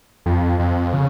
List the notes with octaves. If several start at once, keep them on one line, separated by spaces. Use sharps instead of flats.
F2
F2
C#3